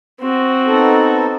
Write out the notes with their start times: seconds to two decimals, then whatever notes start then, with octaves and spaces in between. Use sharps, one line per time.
0.20 C4 F#4
0.66 B3 D#4 A4